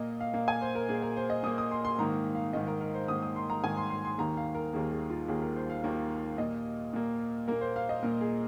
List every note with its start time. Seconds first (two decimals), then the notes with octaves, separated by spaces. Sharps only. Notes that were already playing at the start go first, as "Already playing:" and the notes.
Already playing: A#2 A#3 D#5
0.20 F5
0.34 A#2 A#3 F5
0.48 G#5
0.61 C5
0.75 A#4
0.89 A#2 A#3 G#4
1.02 A#4
1.17 C5
1.30 D#5
1.43 A#2 A#3 D#6
1.58 D#6
1.71 C6
1.85 C6
1.98 G#2 D#3 A#3 A#5
2.35 F5
2.53 G#2 D#3 A#3 D#5
2.67 A#4
2.81 A#4
2.94 C5
3.08 G#2 D#3 A#3 D#6
3.22 D#6
3.36 C6
3.50 A#5
3.64 G#2 D#3 A#3 G#5
3.77 C6
3.90 C6
4.05 C6
4.18 D#2 D#3 A#3 A#5
4.37 F5
4.55 A#4
4.73 D#2 D#3 A#3 G#4
4.92 G#4
5.10 F4
5.28 D#2 D#3 A#3 G#4
5.42 A#4
5.56 C5
5.70 F5
5.84 D#2 D#3 A#3
6.38 A#2 A#3 D#5
6.93 A#2 A#3
7.48 A#2 A#3 A#4
7.61 C5
7.76 F5
7.89 D#5
8.03 A#2 A#3 A#4
8.21 G#4